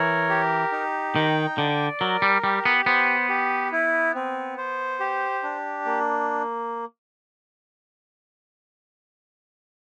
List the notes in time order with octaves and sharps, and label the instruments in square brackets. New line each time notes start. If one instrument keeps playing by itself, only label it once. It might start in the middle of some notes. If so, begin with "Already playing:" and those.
Already playing: [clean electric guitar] E3 [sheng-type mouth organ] A#4 C#5
[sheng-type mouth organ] G4
D#4
[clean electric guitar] D#3 [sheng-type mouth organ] G5
[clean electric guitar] D3 [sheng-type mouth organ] D5
[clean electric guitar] F#3 [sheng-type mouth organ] A#4
[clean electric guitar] G3
[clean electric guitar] G3 [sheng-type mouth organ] G4
[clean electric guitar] B3
[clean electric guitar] B3 [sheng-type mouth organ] C5
[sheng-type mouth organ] G4
E4
C4
C5
G4
D4
A#3